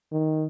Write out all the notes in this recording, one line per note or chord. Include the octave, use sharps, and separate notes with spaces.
D#3